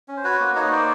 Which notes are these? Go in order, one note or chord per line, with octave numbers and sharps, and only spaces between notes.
C#4
C5
F#4 B4 C#5
A#3
D#4 C#5 D#5
A#3 C5 D5